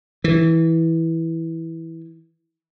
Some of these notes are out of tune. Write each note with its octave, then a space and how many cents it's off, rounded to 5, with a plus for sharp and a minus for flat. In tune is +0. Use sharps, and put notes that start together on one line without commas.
E3 -10